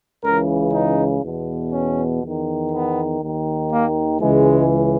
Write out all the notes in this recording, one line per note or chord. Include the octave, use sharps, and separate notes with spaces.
C#2 C#3 E3 A#4
D#4
E2 B2
C#4
E2 D#3
B3
D#2 D#3
A#3
C#2 C#3 E3 G#3